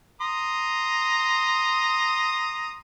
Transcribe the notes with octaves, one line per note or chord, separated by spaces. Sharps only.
A#5 C6 D#6